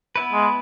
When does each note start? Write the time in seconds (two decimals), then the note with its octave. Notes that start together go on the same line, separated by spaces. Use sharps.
0.16 B3 E4 B4
0.33 G#3